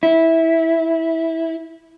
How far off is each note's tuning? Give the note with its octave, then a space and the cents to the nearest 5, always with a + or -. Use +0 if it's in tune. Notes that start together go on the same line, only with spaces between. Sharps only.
E4 -15